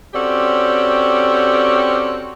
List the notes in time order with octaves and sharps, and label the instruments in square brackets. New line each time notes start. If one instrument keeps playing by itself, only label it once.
[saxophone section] C4 C#4 F#4 G4 A4 D5